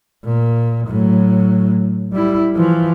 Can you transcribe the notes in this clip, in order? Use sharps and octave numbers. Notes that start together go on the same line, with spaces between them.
A#2
A2 F#3
G3 E4
E3 F3